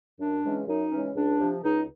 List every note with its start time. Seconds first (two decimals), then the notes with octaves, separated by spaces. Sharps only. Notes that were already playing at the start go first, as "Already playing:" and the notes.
0.19 F#2 D4
0.44 C#3 E3 G#3 C#4
0.66 F#2 D#4
0.92 C#3 E3 G#3 C#4
1.15 C#2 D4
1.39 C3 F3
1.63 C#2 D#4